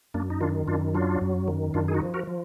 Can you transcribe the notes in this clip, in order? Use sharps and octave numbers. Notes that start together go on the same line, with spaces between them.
F#2 A#3 D4
D#4
D#3 D4 F4
F#2 D4 F4
F#3 D4 F4
F#2
D#3
F#2 D4 F4
G#4
D#4 F#4
F3
F#4 A#4
F3